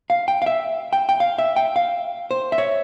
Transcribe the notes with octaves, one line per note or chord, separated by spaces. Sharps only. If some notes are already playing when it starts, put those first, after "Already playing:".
F5
G5
F5
E5
G5
G5
F5
E5
G5
F5
C5
E5
C#5